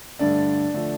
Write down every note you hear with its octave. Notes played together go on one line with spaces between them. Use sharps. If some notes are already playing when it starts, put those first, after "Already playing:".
G2 D3 A3 D4
D3 F3 A3